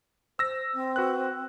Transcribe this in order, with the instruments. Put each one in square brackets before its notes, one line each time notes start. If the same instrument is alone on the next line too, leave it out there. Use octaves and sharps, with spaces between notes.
[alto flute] C5 [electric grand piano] E6 A#6
[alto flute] C4
[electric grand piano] F#4 B4 F#6